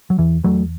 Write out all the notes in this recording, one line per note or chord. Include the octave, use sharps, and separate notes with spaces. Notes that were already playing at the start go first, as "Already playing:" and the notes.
F#3
E2 E3
E2 F#3 A3